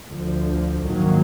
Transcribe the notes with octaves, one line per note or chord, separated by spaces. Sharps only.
D2 D3 F3
A#1 G#2 D#3 F#3 A#3